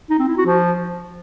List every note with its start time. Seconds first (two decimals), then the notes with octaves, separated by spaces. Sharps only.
0.10 D#4
0.19 C4
0.28 E4
0.37 F#4
0.46 F3